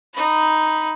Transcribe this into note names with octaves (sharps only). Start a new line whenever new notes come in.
D#4 B5